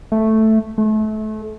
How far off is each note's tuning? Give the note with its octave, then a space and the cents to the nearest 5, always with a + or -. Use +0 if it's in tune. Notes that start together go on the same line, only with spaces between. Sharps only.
A3 +0
A3 -30